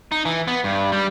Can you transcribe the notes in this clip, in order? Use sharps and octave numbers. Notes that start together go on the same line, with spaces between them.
D#4
E3
B3
G2
G3